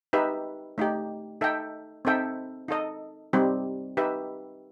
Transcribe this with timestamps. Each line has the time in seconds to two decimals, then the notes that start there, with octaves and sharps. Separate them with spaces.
0.13 D#4 G4 B4 E5
0.78 A3 D#4 G4
1.41 D#4 A4 E5 G5
2.05 C4 D#4 A4 E5 G5
2.68 D#4 A4 D#5
3.33 G3 C4 D#4 G4
3.97 D#4 G4 B4 E5